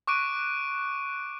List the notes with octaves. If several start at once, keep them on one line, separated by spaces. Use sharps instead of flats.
C#6 D6 F#6 D7 D#7